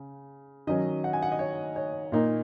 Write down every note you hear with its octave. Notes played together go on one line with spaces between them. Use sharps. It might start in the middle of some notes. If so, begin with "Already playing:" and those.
Already playing: C#3
D#3 F#3 C#4 D#5
F#5
G#5
F#5
D#5
C#5
C#5
A#2 A#3 D#4